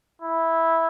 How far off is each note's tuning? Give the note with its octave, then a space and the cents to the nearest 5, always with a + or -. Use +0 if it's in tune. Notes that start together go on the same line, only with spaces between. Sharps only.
E4 -10